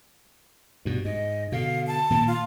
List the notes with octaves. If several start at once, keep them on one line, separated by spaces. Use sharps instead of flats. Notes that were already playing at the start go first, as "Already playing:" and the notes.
G2 B2
G#2 D#5
B2 D3 F5
A5
A#2 D#3 A#3
F4